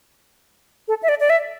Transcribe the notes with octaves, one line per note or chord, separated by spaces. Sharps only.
A4
E5
D5
D5
E5